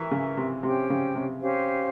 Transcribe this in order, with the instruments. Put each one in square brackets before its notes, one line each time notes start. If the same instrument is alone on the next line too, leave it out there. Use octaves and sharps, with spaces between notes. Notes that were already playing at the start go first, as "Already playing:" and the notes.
Already playing: [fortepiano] E3 [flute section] A#4 E5 A#5 C#6
[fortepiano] C#3
C3
[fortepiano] C3 [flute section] C#4 G4 C5 G5
[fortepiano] C#3
C3
[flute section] C#4 G4 C5 F5